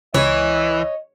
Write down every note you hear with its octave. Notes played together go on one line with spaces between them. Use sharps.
C#2 E3 C#5 D#5